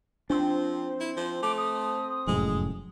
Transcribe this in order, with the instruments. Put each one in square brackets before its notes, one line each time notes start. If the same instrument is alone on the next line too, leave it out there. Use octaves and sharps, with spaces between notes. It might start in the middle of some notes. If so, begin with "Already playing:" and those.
[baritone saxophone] F3 [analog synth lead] C4 [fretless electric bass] D4
[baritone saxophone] E4
F3
[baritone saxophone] A3 [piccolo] D6
[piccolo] D#6
[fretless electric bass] F1 F#2 A2 [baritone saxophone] G#3